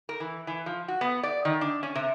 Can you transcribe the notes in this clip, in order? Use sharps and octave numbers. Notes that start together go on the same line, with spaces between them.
A#4
E3
E3
F3
F#4
B3
D5
D#3
D4
C#4
C3